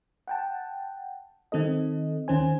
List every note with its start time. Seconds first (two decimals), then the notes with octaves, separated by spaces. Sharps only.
0.28 F#5 G5 A5
1.52 D#3 C4 A4 D#5
2.28 D#2 D#3 C#4 C5 G#5